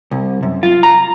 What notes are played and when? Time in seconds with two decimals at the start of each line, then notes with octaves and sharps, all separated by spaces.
0.11 C2
0.43 F#2
0.63 F4
0.83 A#5